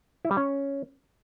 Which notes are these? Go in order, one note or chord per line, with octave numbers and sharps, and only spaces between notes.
E4
G3
C#4